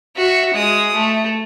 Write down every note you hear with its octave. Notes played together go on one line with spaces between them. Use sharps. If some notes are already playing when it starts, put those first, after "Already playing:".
F#4 E5
G#3 D#6
A3